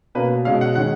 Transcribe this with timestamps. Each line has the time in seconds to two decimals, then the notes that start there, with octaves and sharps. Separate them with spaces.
0.15 B2 A#3 C#4 B4
0.45 B2 G#3 C#4 F5
0.61 F#5
0.75 D#3 G#3 C#4 F#5